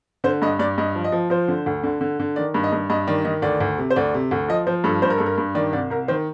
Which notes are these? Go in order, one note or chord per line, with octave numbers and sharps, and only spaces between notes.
D3 C5
G2 D#5
G2 D5
G2 D#5
F3
D#5
F3
F3 C5
D3
D2
D3
D3
D3
D#3 D5
G2
D#5
G2
G2 D#5
D#3 D5
D#3 D#5
D2 D5
D2
C3
C5
D2 D5
C3
D2
F3 D#5
F3 C5
G2 A4
G2 C5
A#4
G2 A4
A#4
G2
D#3 D5
C2 D5
C2 A#4
D#3 C5